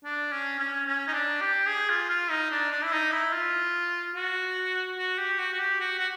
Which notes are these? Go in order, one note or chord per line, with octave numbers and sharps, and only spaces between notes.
D4
C#4
C#4
C#4
D#4
D4
G4
G#4
F4
F4
D#4
D4
D4
E4
D#4
E4
F4
F#4
F#4
G4
F#4
F#4
G4
F#4
F#4